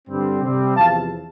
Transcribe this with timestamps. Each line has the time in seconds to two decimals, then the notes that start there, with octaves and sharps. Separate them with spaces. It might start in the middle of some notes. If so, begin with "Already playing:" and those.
0.08 G2 D3 G3 C4
0.42 C3 G3 C4
0.76 E2 C3 F3 F5 A5